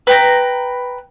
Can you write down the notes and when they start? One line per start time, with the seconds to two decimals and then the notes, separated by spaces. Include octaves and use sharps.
0.07 B4 G5 A#5